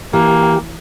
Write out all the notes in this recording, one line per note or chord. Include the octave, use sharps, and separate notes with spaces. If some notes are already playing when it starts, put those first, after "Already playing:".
E3 A#3 G4